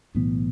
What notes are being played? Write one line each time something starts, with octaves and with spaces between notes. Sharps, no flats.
B1 A2 E3 B3